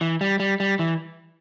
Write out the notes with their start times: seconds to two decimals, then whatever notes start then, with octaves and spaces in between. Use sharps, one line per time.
0.01 E3
0.21 G3
0.40 G3
0.60 G3
0.79 E3